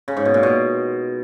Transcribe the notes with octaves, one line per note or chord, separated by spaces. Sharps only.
C#3
G#2
B2
A#2
B2